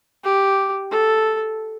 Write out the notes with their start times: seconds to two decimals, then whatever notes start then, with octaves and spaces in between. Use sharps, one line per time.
0.24 G4
0.91 A4